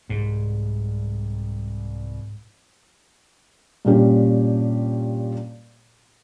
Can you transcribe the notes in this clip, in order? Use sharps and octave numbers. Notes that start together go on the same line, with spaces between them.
C2 G#2
G2 A#2 C#4 G4